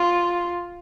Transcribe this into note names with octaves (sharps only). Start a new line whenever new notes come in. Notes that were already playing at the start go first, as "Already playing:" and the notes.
Already playing: F4